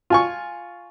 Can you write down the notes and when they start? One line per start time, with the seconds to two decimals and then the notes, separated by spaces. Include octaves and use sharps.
0.10 F4 G#5 C#6